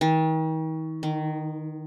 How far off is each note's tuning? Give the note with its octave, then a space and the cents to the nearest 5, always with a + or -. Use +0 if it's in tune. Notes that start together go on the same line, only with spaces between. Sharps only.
D#3 +40
D#3 -15